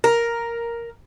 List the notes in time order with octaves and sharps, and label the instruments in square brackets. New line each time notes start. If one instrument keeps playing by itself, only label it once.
[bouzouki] A#4